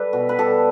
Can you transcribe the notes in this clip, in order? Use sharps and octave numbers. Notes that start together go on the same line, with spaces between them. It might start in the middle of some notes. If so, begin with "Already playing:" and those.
Already playing: G3 A4 B4
B2
B4
G3 A4